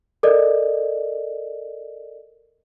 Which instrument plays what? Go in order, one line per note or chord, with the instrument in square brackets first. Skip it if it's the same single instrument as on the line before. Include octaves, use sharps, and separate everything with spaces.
[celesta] A4 A#4 D5 D#5